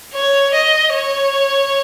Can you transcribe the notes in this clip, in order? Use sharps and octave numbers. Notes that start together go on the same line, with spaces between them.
C#5
D#5
C#5